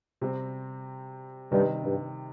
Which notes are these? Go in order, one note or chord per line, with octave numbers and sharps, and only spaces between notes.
C3 G3 C4
G2 C3 D#3 G3
G2